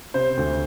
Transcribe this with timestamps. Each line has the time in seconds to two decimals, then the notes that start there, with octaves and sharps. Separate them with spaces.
0.14 C3 C5
0.37 D2